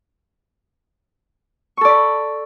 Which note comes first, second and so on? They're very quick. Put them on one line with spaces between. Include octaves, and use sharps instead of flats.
C#6 A4 D5 B5